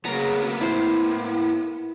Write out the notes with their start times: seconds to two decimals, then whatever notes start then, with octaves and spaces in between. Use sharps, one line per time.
0.05 C#3 F#3 A#3 B3 A#5
0.61 A2 E4 C5